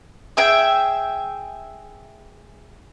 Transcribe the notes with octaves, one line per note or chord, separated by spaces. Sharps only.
G#4 E5 G5